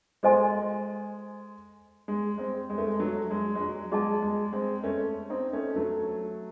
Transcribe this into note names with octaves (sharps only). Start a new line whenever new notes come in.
G#3 A4 C5 D#5 G#5 C6
G#3
G#3 C4
G#3
A3
G#3
F#3 A3
G#3
G#3
F#3
G#3 G#4 D#5 A5
G#3
G#3 C4
A3 C#4
C4 D#4
A3 C#4
F#3 A3